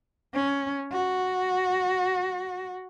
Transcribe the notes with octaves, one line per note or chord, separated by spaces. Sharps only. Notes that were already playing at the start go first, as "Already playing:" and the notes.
C#4
F#4